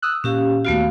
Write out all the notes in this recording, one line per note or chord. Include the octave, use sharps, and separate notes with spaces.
D#6 E6 F#6
A#2 C#4 G4 F5
D#2 A3 B3 F#4 F5